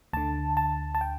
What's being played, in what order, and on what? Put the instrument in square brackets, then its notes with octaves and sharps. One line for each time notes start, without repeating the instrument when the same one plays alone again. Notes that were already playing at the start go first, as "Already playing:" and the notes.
[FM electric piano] D2 D3 A5
A5
A5
G5